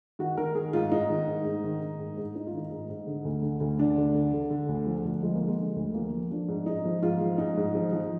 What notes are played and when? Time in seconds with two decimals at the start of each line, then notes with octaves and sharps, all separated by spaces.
0.19 D#3 F#4
0.37 D#3 A#4
0.55 D#3 G#4
0.73 G#2 F4
0.92 G#2 D#4
1.10 D#3
1.28 G#2
1.45 G#2
1.64 D#3
1.82 D#3
1.99 G#2
2.17 G#2
2.35 G#2 D#4
2.47 F4
2.53 D#3 D#4
2.71 G#2
2.89 G#2
3.07 D3
3.25 D2
3.42 D3
3.61 D2
3.79 D3 D4
3.98 D2
4.14 D3
4.33 D3
4.50 D3
4.69 D2
4.87 F3
5.05 D2
5.23 F3 G#3
5.35 A#3
5.40 D3
5.47 G#3
5.58 D3
5.76 D2
5.94 F3 A#3
6.12 F3
6.31 F3 D4
6.48 G#2
6.66 G#2 D#4
6.85 F3
7.02 G#2 F4
7.21 F3
7.38 G#2 D#4
7.57 G#2
7.75 F3
7.93 F3